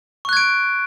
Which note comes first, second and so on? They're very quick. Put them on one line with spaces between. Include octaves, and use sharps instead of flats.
C#6 F#6 G#6 D7